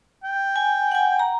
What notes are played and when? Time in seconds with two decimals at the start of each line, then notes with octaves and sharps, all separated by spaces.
0.24 G5
0.56 G#5
0.91 F#5 G#5
1.19 A#5